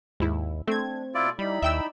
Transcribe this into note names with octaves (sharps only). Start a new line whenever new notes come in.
D#2 G#2 E4
A3 C4 D4 G#6
B2 E4 F4 D5
G3 D#4 E4 D5 B5
D#2 E5 G5 E6